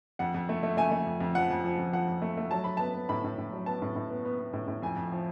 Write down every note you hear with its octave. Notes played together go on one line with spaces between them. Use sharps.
F2 F#5
F2
A3
A3
A3 G#5
A3
F2
F2
F3 F#5
F2
F3
F2
F3 F#5
F2
A3
A3
F#3 A5
F#3 B5
B3 A5
B3
A2 B5
A2
A2
F#3
B3 A5
A2
A2
B3
B3
B3
A2
A2
F2 G#5
F2
F3